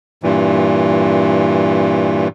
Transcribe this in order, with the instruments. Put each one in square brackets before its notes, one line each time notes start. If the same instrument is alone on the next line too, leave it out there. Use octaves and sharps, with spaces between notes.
[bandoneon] G2 A#2 E3